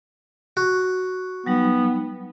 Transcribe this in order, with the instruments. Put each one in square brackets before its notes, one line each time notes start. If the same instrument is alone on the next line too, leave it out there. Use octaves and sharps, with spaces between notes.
[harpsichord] F#4
[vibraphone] F#3 G3 D#4 [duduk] B3